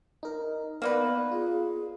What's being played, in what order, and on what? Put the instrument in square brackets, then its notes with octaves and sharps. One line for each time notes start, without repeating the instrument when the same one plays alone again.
[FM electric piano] D#4 A#4
[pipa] A#3 D#4 B4 [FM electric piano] B3 [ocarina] D5
[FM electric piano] F4 [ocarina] G#4